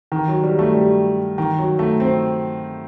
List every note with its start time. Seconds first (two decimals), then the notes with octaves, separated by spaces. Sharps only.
0.12 D#3
0.28 F#3
0.43 G3
0.59 A3
0.74 G3
1.38 D#3
1.58 F#3
1.79 A3
2.00 C4